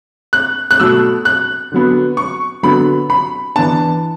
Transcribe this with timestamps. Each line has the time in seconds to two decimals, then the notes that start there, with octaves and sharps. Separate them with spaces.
0.33 F#6
0.71 F#6
0.79 B2 F#3 A3 E6
1.25 F#6
1.72 D3 F#3 B3
2.17 C#6
2.63 D3 F#3 B3 B5
3.10 B5
3.56 E3 B3 D4 A5